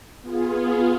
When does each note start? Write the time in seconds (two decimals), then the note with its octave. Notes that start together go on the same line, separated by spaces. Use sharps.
0.21 B3 F4 G#4